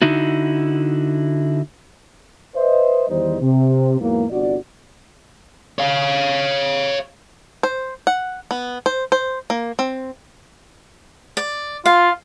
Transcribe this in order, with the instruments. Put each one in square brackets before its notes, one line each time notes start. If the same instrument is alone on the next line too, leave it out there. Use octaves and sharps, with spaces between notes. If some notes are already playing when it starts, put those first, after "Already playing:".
[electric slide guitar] D3 D#4 E4 F#4
[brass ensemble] B4 C5 D#5 E5
E2 D#3 G3 D#4 C5
C3
E2 G#2 E3 F#3 A#3
G1 C3 F#4 D5
[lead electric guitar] C#5 F5
[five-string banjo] C5
F#5
B3
C5
C5
A#3
C4
[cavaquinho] D5
[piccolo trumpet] F4 [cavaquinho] F5